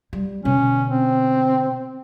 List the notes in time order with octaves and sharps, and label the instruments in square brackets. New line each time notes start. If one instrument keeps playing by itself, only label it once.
[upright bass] G3
[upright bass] B2 D3 [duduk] C#4
[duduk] C4